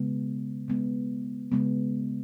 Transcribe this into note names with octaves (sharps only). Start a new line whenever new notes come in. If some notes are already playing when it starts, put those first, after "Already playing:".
Already playing: C#3 G#3 B3
C#3 G#3 B3
C#3 G#3 B3